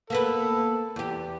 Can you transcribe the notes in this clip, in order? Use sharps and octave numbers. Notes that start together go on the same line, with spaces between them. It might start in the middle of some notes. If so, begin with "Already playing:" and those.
A#3 B3 A4 B4
E2 G4